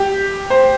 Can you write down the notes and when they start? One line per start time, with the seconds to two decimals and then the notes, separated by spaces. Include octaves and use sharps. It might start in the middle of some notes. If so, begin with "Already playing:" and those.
Already playing: G4
0.50 C5